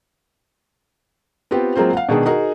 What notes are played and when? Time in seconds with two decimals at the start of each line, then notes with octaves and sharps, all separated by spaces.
1.51 B3 C4 F4 G4
1.75 F#3 G#3 A#3 C4 F4 C5
1.93 F5 F#5
2.09 B2 D#3 G#3 D4 G#4
2.26 D#4 F#4 G#4 A#4